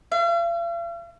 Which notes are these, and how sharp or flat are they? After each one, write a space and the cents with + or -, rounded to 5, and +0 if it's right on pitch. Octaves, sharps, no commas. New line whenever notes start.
F5 -45